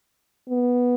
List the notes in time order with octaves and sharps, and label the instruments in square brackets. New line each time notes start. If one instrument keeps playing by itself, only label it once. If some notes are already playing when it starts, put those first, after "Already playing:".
[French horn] B3